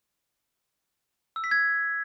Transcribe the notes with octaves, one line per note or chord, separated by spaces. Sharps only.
E6
B6
G#6